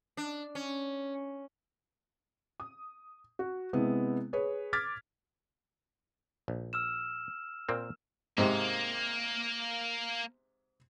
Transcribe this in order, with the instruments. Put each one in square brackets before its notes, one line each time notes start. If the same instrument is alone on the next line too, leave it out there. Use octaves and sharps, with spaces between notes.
[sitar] D4
C#4
[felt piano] D#6
F#4
C3 G#3 B3 E4
G#4 B4 C#5
D6 F6 G#6 A6 B6
[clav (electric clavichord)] A#1
[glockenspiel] E6 F6 E7
[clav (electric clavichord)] A#2 A#3 C4
[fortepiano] G#2 C3 [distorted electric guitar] A#3